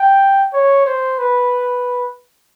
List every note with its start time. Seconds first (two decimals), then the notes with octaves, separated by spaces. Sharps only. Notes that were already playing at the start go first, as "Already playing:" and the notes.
Already playing: G5
0.53 C#5
0.86 C5
1.18 B4